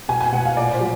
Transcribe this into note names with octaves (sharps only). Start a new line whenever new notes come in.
B2 G#5
G#5
B2 F#5
F5
A#2 D5
C5
F#3